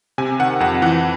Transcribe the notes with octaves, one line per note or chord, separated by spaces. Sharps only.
C3 G#5
D#3 F#5
F2 F#5
E3 F#5